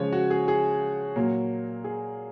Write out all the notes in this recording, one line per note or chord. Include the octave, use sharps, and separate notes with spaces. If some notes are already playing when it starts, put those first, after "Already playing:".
Already playing: C#3 F3 G#3 C#5
F#4
G#4
G#4
A#2 F#3 A#3
G#4